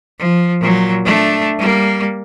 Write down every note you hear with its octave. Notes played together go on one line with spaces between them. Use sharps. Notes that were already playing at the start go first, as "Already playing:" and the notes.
F3
A#2 F#3
A3 D4
G3 A#3